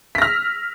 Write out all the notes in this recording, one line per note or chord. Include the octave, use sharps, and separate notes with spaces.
E6 F6 A#6 B6